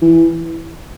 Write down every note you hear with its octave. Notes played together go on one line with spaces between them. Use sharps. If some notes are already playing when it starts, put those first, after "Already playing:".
E3